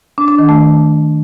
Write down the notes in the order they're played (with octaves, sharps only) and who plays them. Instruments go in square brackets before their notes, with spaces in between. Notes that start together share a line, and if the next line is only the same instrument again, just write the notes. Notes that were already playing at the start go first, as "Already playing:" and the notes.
[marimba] D4
D4
D#3
A3